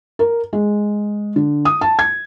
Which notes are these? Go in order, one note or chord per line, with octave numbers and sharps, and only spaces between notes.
A#4
G#3
D3
D#6
A5
G#6